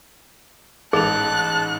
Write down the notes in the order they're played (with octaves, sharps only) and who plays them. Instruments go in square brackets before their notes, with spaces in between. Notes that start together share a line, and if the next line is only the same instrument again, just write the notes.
[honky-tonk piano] A1 G#2 F7 [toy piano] G#4 [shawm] A5 [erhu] F#6